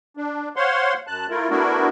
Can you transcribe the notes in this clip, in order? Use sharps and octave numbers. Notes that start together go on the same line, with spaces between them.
D4
C5 C#5 F5 F#5 C6
F#2 A5 F#6
A3 E4 F4 A#4
A3 B3 D4 E4 F#4 A#4